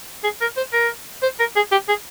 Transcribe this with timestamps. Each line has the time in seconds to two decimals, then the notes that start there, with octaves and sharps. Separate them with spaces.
0.24 G#4
0.41 A#4
0.57 C5
0.73 A#4
1.22 C5
1.40 A#4
1.56 G#4
1.72 G4
1.88 G#4